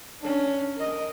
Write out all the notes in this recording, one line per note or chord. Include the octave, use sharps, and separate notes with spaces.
C#4 D4
A#4 D#5